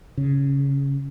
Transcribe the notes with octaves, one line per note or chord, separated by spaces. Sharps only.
C#3